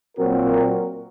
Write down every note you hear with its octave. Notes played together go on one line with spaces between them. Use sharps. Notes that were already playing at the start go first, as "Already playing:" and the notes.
A#2 F#3 C4 F#4 A#4